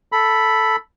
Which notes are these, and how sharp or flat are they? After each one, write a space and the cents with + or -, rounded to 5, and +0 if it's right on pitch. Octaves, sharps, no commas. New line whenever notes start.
A4 +0 B5 +0